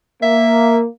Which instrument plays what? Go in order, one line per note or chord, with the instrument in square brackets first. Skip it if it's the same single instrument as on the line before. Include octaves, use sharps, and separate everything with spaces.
[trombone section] A#3 [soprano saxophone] E5